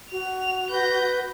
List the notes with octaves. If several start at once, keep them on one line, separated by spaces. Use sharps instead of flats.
F#4 F7
B4 G6 A#6